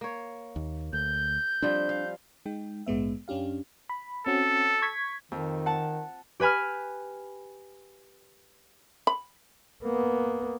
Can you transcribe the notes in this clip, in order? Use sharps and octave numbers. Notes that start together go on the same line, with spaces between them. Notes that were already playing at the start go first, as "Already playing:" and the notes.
A#3 C#5
D#2
D2 G6
F3 G3 C4 D4
F5
G#3 D#4 G5
A#1 G#2 G#3 B3 E5
F#2 C#4 D4 G4 F5
B5
C4 C#4 F#4 A4
C#6 G#6 B6
F2 D#3
F#5 A5
G4 B4 G#5 B5 F6
B5
A#3 B3